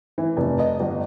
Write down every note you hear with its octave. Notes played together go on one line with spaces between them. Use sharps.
E3
F1
D#5
G1